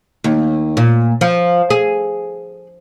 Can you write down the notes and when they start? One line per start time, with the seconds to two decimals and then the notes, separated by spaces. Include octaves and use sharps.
0.24 D#2
0.77 A#2
1.21 F3
1.70 G#4